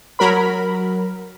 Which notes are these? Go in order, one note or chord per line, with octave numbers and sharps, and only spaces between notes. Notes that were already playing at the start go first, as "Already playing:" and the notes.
F#3 A#4 B5